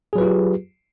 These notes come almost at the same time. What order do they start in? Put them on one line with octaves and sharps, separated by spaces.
G#4 F#3 B4 F4 G4